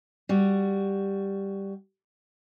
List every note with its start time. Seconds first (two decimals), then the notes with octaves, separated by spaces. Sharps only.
0.29 G3 F#4